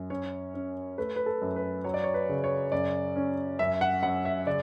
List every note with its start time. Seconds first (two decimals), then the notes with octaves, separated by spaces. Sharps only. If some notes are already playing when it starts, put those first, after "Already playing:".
Already playing: F#2
0.10 C#4 C#5
0.54 C#4
0.98 A3 B4
1.16 B4
1.26 A4
1.42 F#2
1.56 B4
1.84 F#3 C#5
1.94 D5
2.04 C#5
2.14 B4
2.29 C#3
2.44 C#5
2.72 F#2 D5
3.16 C#4
3.59 F#2 E5
3.81 F#5
4.03 F#2 F#5
4.25 E5
4.46 C#3 D5